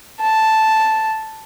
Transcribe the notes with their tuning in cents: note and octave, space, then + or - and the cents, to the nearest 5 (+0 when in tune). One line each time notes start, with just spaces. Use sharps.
A5 +0